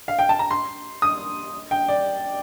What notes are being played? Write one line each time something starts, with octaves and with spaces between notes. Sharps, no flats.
F5
G5
A5
A#5
C6
D#6
G5
D5